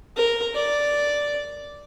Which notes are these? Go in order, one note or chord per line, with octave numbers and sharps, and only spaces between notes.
A#4
D5